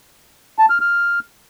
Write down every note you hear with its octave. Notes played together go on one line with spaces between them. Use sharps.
A5
F6
F6